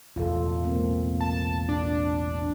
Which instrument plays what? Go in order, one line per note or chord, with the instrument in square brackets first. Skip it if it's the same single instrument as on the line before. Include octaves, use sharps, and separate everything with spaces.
[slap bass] E1 A1 E2 [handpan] F4 A4
[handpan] G#3 A#3 C4
[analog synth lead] A5
D4